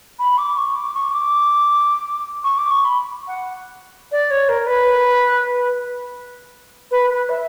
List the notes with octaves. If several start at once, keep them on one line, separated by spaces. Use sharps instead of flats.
B5
D6
C#6
D6
C#6
D6
C#6
D6
C#6
B5
F#5
D5
C#5
A#4
B4
B4
B4
E5